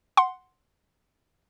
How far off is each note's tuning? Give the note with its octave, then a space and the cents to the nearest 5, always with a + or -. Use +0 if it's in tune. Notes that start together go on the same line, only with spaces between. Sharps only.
F#5 +0 C6 +0